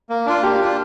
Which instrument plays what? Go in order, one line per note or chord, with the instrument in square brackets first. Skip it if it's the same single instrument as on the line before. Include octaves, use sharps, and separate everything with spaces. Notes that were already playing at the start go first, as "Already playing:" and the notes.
[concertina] A#3
D4 F4
[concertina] A#3 [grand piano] G4
[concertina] D4 F4